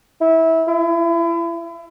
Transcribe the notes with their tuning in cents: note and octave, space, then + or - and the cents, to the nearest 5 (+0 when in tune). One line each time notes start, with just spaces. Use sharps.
E4 -20
E4 +35